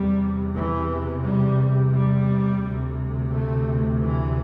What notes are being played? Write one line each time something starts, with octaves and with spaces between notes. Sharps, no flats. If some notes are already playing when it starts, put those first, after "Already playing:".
Already playing: E2 C3 G3
E3
G3
G3
D2 C3
A3
E3